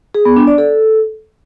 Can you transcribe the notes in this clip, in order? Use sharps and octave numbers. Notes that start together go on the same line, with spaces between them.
G#4
B3
D4
D5
A4